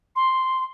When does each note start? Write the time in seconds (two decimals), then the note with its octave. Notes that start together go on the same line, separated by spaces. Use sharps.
0.16 C6